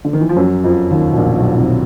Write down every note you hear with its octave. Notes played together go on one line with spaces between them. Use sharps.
D3
D#3
E3
F3
F#2 F#3
F2 F3
D#2 D#3
B2
A#1 A#2
B1 B2
C2 C3